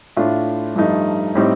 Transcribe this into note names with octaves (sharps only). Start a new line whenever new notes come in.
A2 A3 D4 F4
G2 F3 A3 D#4
A2 G3 C4 D#4